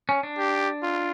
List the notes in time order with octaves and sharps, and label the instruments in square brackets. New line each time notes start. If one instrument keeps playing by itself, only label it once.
[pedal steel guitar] C#4
D4
[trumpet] G4
F4